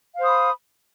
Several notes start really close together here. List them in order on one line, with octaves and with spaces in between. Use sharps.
F5 C5 D#6 B5